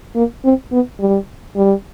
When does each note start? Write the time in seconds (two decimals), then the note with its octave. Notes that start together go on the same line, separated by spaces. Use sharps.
0.16 A#3
0.44 C4
0.72 B3
1.00 G3
1.56 G3